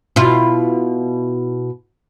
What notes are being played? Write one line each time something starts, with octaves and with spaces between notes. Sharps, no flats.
B2 E4 F4